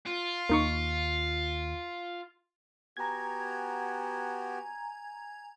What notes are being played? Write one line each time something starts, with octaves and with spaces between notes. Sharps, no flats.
F4
D#2 A#3 D#4 C#6
B3 F#4 G4 G#5 A#5 G#6